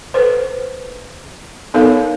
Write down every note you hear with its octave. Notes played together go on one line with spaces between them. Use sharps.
A4 B4 C5
B3 D#4 A4 A#4 C#5 F5